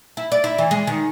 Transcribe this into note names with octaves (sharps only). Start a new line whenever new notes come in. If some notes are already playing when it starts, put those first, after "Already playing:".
E4
D5
E4
E3
G#3
D#3